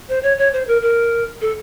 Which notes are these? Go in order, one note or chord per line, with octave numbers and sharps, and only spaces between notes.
C5
C#5
C#5
C5
A#4
A#4
A4